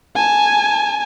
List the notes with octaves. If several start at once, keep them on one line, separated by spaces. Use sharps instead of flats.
G#5 A5